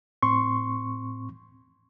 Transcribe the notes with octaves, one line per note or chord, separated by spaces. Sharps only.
A2 C4 C6 C#6